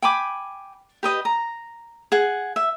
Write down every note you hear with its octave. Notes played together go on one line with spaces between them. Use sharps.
G5 G#5 B5 D6
G4 B4 D#5
A#5
G#4 F#5
E5